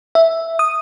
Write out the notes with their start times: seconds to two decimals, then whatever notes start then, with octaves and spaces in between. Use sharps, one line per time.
0.15 E5
0.59 D#6